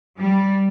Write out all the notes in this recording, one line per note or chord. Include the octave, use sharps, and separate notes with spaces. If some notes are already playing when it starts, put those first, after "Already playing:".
G3